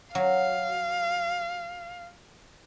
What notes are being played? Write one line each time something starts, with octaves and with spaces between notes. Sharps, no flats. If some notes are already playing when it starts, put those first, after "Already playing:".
F#3 F5